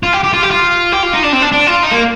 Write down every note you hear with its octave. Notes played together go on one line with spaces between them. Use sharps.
F4
G4
G4
F4
G4
F4
G4
F4
D#4
D4
C4
D4
D4
F4
D#4
A#3